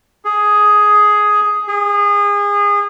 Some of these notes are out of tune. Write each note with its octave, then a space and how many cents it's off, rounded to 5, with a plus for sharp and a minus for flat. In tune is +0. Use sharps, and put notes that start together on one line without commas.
G#4 +5
G#4 -30